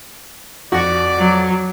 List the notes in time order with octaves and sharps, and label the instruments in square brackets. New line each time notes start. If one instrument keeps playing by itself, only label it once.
[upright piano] F2 [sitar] F#4 [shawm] D5
[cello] F#3